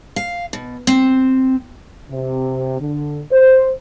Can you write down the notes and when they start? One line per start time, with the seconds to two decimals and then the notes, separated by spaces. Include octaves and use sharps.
0.16 F5
0.53 B2
0.87 C4
2.11 C3
2.81 D3
3.32 C5